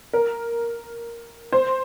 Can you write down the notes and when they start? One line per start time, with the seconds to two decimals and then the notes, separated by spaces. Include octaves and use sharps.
0.13 A#4
1.52 C5